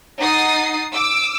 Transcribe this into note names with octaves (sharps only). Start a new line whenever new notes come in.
D#4 F#5 D#6 A6 C7
D6 E6